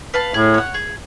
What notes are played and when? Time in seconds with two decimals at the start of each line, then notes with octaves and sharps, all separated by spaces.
0.14 B4 F5 A5
0.34 A2 G#4
0.54 C#5 F#5
0.74 G#4